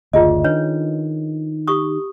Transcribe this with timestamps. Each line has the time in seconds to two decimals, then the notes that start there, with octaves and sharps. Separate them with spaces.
0.13 F#1 D2 F4 G#4 D#5
0.44 D#3 D4 B4 C#5
1.67 G4 C#6 D#6